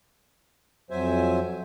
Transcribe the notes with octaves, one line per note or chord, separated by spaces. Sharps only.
F2 F#3 C5 E5 G#5